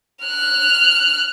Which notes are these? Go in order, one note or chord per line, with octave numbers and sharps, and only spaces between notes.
F6 F#6